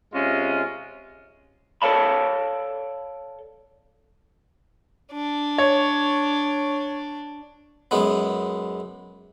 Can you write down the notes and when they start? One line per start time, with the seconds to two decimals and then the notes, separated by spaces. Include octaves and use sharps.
0.14 C3 G#3 C#4 F4
1.82 A4 C#5 D5 F5 A5 B5
5.13 D4
5.58 C#5
7.91 F#2 G#3 B3